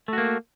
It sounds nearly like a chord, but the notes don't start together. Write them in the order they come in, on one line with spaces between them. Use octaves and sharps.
A3 F#4 A#3